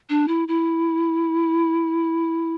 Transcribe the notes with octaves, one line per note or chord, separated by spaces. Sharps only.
D4
E4
E4